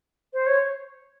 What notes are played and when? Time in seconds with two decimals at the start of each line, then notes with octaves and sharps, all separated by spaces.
0.33 C5
0.47 C#5